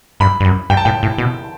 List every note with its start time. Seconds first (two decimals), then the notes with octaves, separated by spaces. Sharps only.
0.20 G2 B5
0.40 G2
0.45 F#2
0.70 G2 G5
0.77 A5
0.85 A2 G5
1.03 A2
1.18 B2